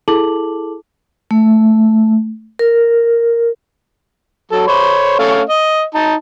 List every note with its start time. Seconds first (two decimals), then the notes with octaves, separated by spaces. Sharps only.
0.08 E4 G#4 A4 A5 D6 F#7
1.31 A3
2.59 A#4
4.52 F#3 A4
4.68 C5 C#5 B5
5.19 A3 C#4 F5
5.50 D#5
5.95 D#4 A5